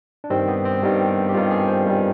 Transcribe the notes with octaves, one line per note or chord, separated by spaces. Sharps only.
D4
G2 D#3 G3 C4
B3
C4
G2 D#3 G3
G4
G2 D#3 G3 F4
G#4
C5
G2 D#3 G3